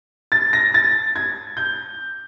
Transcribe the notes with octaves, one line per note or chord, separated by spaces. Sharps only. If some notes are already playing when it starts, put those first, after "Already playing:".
A6
A#6
A6
G#6
G6